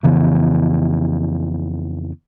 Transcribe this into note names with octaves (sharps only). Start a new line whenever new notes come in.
F2 C#3 E3 B3